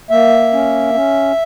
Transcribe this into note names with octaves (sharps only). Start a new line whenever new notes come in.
A#3 E5
C#4
C#4